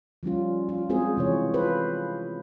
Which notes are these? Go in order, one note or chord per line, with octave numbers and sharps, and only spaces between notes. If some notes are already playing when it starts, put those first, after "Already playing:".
F3 G3 C#4 F4
F4
G#3 C4 F4 F#4 G#4 C5
C3 E3 C#5
F4 A4 B4 C5